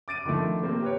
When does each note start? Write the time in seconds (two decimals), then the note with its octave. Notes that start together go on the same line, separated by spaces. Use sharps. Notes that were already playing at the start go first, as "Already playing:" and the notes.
0.08 D6 A6 D7 D#7
0.25 D3 D#3 F3 A3
0.63 C3 A#3 C4 A#4
0.82 G4 B4 C#5